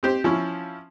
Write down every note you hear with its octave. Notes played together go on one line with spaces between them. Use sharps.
C4 G4 C5
F3 C#4 E4